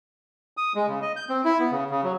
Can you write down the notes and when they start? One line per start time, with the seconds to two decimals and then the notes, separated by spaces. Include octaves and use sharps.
0.57 D#6
0.75 G#3
0.88 C#3
1.02 D#5
1.16 G6
1.29 C4
1.45 E4
1.59 B3
1.71 C#3
1.90 C#3
2.03 F#3